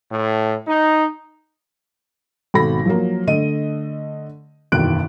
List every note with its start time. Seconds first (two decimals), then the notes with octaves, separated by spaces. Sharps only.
0.12 A2
0.67 D#4
2.54 G#1 B2 A4 B5 A#6
2.85 F3 F#3 A#3
3.27 D3 A3 D#5 D#7
4.72 F#1 B1 E2 D#3 F#6 D7